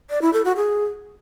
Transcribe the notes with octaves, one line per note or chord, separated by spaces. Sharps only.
D5
E4
A4
F#4
G#4